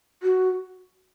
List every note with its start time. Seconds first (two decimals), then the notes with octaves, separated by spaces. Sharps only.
0.23 F#4